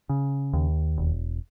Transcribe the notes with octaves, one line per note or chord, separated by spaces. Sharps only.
C#3
D#2
E1